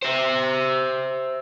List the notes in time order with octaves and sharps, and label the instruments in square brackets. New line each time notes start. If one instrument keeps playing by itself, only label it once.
[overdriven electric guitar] C5 E5